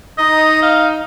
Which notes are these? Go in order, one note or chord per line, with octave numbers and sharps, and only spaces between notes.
D#4 D#5
F5